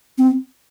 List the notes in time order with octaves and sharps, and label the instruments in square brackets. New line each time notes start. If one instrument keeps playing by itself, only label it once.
[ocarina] C4